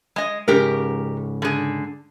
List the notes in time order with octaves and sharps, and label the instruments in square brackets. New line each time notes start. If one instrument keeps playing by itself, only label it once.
[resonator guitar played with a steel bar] G#3 D#5
[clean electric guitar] G#2 C#3 [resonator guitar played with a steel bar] G4 A#4
[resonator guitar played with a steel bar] D3 G#4